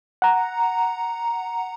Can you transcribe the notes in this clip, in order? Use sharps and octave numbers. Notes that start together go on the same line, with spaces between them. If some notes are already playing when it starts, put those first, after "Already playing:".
F#5 A#5